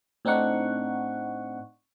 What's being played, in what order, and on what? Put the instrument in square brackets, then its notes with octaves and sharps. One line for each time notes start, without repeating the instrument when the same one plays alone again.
[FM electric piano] A2 C4 D4 D#4 F#5 C#6